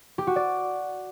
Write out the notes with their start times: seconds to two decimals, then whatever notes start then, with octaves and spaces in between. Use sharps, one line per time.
0.18 G4
0.27 F#4
0.36 D5